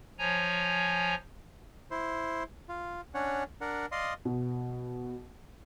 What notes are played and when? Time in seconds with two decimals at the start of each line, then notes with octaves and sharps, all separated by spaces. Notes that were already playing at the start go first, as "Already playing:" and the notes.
0.19 F3 C#5 G#5 A#5
1.91 E4 C5
2.69 F4
3.14 C#4 D4 C#5 F#5
3.61 D4 A#4 F#5
3.92 D5 D#5 F5 C6 D#6
4.25 B2